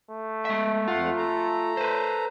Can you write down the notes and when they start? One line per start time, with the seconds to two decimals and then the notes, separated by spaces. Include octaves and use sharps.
0.11 A3
0.45 G#3 E5
0.88 F2 F4 F#5
1.17 A4 A#5
1.77 B4 C5